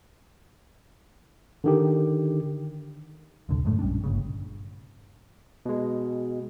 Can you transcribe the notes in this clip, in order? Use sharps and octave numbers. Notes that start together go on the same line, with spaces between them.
D3 D#3 G4
D#1 C2 A#2 D3
F#2 A2 G#3 A3
A#1 G3 C#4 D4
G1 A#2 C#3
B2 G#3